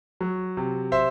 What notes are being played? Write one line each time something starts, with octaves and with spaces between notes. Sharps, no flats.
F#3
C3
C5 E5